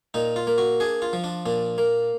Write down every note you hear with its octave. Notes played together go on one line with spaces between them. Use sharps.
A#2 D#4
F4
A#3
F#4
D4 G#4
F4
F3
D4
A#2 D4
A#3